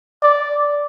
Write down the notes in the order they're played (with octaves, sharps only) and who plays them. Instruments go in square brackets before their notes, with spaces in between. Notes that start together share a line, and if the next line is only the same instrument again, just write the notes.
[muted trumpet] D5